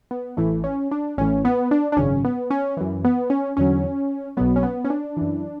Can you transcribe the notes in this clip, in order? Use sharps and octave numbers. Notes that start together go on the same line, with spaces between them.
B3
A1 A2 E3 A3
C#4
D4
A1 A2 E3 C#4
B3
D4
D4
G#1 F#2 C#3 C#4
B3
C#4
F#2 E3
B3
C#4
E2 D3 F#3 C#4
B1 B2 F#3 B3
C#4
B3
C#4
D4
F#2 E3